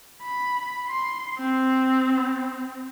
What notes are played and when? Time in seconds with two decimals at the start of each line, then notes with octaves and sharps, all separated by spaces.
0.22 B5
0.88 C6
1.39 C4